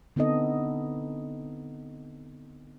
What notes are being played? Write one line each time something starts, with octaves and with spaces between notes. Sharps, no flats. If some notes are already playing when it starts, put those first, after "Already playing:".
D3 B3 C4 D#4 A4 D#5